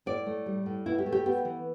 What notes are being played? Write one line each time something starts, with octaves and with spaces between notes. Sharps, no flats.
A2 D5
A3
G3
A2
B2 E4
G4
A3
G4
B3 G4
E3